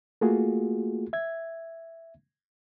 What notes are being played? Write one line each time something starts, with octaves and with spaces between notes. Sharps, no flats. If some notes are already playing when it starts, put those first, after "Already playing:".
A3 A#3 F4 F#4 G#4
E5 G#6